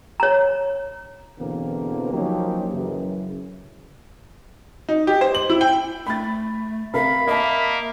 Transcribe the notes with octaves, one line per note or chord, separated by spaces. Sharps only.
C#5 A#5
E2 B2 D3 E3 A#3 C4
F3 F#3 A#3 C#4 D#4 G4
F#2 C#3 E3
D#4
G4
C5
F#7
E4
G5
A3 B5 A6
C3 A#4 F5 B5
A#3 D#5 E5 A5